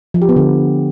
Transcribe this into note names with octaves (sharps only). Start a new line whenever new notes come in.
F3
G4
B3
D3